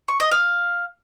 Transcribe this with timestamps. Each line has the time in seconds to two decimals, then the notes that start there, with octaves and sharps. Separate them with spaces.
0.08 C#6
0.20 D#5
0.32 F5